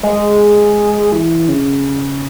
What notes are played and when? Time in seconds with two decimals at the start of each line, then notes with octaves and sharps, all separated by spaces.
0.03 G#3
1.12 E3
1.49 C#3